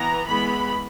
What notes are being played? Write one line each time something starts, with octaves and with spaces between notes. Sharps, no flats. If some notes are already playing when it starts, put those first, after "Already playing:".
Already playing: E3 B3 A#5
E3 G#3 B3 B5